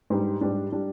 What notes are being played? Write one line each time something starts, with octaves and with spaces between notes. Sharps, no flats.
G#2 G3 D4
G#2 G3 D4
G3 D4